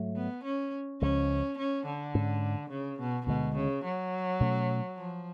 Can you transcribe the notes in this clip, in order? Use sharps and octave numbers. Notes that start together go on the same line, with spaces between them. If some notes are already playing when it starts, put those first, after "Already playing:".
Already playing: G#2 F#3 A3
B3
C#4
C#2 C#3 F3 G#3 C#4
C#4
D3
G#2 G#3 C#4
C#3
B2
D2 B2 D3 G#3
C#3
F#3
B2 A3 C#4
F3